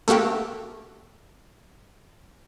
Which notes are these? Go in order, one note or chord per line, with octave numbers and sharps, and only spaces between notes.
A3 A#3 F#4 G4